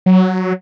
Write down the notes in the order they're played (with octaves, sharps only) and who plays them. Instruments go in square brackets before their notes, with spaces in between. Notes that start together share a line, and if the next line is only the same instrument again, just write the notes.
[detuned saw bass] F#3